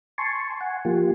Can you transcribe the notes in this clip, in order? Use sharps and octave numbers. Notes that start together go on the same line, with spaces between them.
G#5 A5 C6 C#6
F#5 G#5
F3 A#3 F4 G4